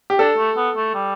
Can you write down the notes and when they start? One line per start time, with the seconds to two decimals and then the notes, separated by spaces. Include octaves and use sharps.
0.10 G4
0.18 D4 A4
0.37 A3
0.56 B3
0.76 A3
0.94 G3